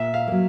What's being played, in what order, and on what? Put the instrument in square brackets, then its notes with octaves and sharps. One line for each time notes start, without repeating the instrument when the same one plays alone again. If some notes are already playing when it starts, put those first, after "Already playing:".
Already playing: [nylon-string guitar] A#2 [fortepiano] E5
[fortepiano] F5
[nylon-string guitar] F#3 A#3